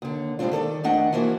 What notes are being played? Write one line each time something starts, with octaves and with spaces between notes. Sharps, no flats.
D#2 D3
A2 G3 G#3 C4 D4 F4
D#3 A4 C5 D5
F2 D#3 A3 D4 D#5 F#5
E3 F3 A#3 D4 E4 F#4